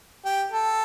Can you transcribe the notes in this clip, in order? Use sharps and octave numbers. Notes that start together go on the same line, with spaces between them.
G4
A4